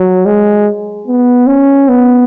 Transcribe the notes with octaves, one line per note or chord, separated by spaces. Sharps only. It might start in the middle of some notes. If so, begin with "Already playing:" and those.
Already playing: F#3
G#3
B3
C#4
B3